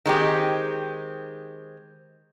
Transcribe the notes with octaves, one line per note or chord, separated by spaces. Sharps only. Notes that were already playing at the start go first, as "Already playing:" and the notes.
D#3 G#3 C4 G4